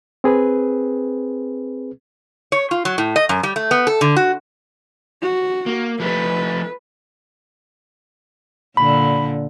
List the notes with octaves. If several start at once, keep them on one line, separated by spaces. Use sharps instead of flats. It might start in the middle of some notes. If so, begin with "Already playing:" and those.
C4 G#4 B4
C#5
F4
F#3
A2
D#5
F#2
G3
A3
B3
A4
D3
F#4
F#4
A#3
F3 A3 B4
A#2 D3 B5